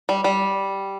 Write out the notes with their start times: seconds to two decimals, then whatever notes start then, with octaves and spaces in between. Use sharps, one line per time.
0.09 G3
0.24 G3